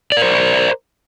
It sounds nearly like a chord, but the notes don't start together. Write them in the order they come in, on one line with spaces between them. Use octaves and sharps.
D5 A#4 C5